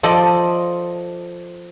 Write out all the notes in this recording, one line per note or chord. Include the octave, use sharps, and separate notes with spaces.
F3 A4 D5 D#5